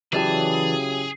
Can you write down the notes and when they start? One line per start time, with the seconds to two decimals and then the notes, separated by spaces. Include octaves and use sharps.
0.13 C#3 E3 F#3 E4 G4 G#4 D5 A5